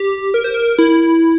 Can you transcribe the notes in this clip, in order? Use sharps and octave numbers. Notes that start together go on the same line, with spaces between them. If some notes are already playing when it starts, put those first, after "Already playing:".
Already playing: G4
A#4
C5
A#4
E4